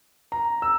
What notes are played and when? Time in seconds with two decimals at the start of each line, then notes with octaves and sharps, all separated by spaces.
0.32 A#5
0.62 E6